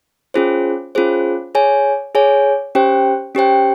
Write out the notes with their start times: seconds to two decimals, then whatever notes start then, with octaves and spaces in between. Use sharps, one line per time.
0.34 C#4 F4 G#4 C5
0.95 C#4 F4 G#4 C5
1.55 G#4 C#5 G#5
2.15 G#4 C#5 G#5
2.75 C#4 G4 C5 G5
3.35 C#4 G4 C5 G5